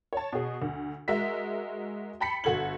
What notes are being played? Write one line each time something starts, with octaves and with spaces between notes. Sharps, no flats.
C#5 A5
B2 G#4
D2
G#3 F#4 A#4 E5 B6
G5 A5 B5 B6 C#7
G1 F#4 A4 G#6 F#7